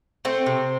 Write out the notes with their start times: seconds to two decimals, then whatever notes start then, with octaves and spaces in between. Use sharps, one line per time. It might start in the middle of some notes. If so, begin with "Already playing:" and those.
0.25 A3 C4
0.46 C3